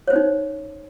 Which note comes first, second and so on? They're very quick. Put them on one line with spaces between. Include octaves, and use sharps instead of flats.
C#5 C5 C#4 D#4